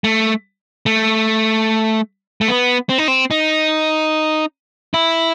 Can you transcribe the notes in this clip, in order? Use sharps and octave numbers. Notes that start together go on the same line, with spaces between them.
A3
A3
A3
B3
C4
D#4
C4
D#4
E4